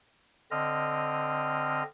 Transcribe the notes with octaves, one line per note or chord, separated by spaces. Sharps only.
D3 C4 D#5 F6